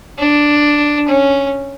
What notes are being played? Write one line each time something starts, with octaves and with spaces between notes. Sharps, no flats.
D4
C#4